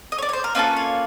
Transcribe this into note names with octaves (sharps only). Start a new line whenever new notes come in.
D#5
C#5
D5
C#5
C5
A#4
A#3 C#4 F4 A4 B4
C#5